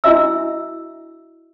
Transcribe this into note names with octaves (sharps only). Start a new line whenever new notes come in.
D4 E4 F#4 D#5 E5 E6